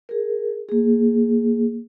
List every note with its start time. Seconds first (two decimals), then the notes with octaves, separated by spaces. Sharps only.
0.09 G#4 A#4
0.69 A#3 G#4